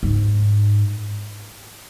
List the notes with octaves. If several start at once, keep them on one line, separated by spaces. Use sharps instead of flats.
G#2